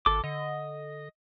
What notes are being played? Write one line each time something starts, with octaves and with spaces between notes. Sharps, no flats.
G#1 A4 D6
D3 D#5